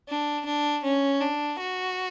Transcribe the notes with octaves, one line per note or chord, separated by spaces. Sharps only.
D4
D4
C#4
D4
F#4